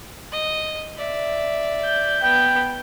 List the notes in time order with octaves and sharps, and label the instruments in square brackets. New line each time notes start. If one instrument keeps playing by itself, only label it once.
[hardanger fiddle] D#5
D5 E5
[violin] G6
[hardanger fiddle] B3 [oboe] G5